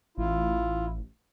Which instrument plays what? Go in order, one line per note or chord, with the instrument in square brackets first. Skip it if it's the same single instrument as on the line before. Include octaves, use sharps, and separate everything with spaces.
[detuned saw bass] A1 [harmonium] E4 F4